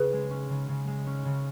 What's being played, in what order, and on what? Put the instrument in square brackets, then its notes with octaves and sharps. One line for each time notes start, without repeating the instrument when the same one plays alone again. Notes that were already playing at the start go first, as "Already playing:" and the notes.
Already playing: [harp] C#3 C#4 [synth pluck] G#4 B4
[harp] G#3
C#4
C#3
C#3
G#3
C#4
C#3